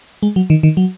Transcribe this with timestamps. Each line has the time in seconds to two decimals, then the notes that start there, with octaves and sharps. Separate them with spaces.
0.23 G#3
0.36 F#3
0.50 D#3
0.63 D#3
0.77 F#3